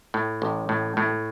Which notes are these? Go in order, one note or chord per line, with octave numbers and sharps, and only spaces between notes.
A2
A1
A2
A2